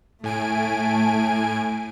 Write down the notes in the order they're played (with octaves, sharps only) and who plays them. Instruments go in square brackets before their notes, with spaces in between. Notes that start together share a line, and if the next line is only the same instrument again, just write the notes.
[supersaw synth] A2 G#5 D7 [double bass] A3